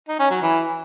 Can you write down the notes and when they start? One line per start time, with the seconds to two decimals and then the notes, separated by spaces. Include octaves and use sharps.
0.08 D#4
0.20 C#4
0.31 F#3
0.42 E3